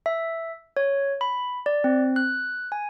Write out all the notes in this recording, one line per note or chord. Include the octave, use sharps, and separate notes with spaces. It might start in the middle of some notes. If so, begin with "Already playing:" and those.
E5
C#5
B5
D5
C4
F#6
G#5